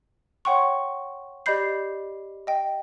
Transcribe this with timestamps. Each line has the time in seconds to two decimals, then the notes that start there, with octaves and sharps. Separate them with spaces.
0.45 C#5 F#5 G5 C6 C#6
1.46 G4 D5 D#5 B5 G6 C7
2.47 D#5 G5